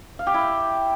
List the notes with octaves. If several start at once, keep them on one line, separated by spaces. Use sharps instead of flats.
F5
G4
E4